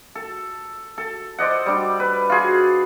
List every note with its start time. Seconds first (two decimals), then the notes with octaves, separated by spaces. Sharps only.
0.15 A4
0.98 A4
1.39 C5 D5 D#5 F#5
1.66 G3 D4
2.00 B4
2.30 F4 F#4 G#4